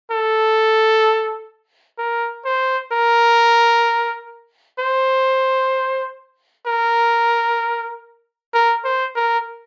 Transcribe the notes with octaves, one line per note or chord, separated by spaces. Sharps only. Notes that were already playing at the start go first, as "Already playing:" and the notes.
A4
A#4
C5
A#4
C5
A#4
A#4
C5
A#4